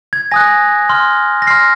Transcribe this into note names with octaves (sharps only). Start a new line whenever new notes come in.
G#6
G#5 D#6 F#6 A#6
C6 F6
A#6
C6 F6 C7